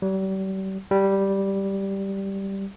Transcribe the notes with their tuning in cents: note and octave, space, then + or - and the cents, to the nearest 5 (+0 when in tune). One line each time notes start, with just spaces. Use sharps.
G3 -40
G3 -5